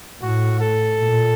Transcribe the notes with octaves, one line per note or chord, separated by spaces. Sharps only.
A2 F#4
A4
A#2